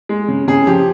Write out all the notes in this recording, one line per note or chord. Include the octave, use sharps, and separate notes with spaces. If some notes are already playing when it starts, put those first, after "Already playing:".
G#3
C#3
C#3 G#4
F3 G4